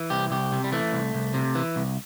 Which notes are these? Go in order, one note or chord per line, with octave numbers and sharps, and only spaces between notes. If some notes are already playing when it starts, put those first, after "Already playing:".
Already playing: E3
C2 G4
C2 G4
C3
G3
E3 A3
C2
C2
C3
E3
C2